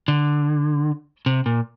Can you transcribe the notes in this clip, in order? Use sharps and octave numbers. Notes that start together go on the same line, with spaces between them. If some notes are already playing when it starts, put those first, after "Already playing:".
D3
C3
A#2